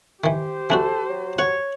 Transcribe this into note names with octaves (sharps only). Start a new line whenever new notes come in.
D#3 E3 G4 C5
E3 D4 F#4 A4
F#3
C#5 F#5